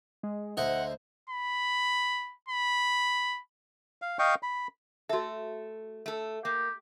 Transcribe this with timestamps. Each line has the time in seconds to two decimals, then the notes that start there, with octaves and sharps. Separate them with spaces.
0.23 G#3
0.57 D2 C5 D#5 E5 F#5
1.30 B5
2.48 B5
4.02 F5
4.19 D#5 F5 G5 C#6
4.43 B5
5.09 A3 F#4 A4 E5
6.06 A3 A4
6.45 A#3 G4